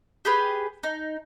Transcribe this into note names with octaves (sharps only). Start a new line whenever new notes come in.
G4 G#4 B4
D#4